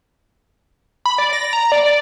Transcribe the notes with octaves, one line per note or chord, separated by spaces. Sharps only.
B5
D5
A#6
A#5
D5
D5